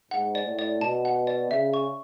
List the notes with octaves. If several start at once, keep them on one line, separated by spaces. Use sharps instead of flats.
G#2 F#5
D5
A2
D5
B2 A5
F#5
D5
C#3 E5
C#6